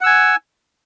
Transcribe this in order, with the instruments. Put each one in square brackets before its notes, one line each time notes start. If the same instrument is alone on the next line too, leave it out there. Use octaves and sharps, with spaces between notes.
[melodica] F#5
E6
G#5